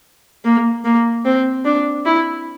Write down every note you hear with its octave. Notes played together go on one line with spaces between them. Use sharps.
A#3
A#3
C4
D4
E4